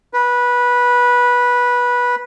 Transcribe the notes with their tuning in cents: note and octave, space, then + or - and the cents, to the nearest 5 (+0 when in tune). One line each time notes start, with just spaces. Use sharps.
B4 -15